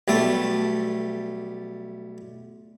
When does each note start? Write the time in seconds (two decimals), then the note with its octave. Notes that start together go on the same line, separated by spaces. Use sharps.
0.08 B1 G3 A3 A4